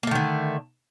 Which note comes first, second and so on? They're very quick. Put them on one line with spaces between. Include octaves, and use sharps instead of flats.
A#3 A3 D#3 D3